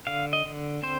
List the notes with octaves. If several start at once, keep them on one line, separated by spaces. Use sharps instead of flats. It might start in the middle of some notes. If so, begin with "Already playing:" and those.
D3 F5
D#5
D3
C4 C5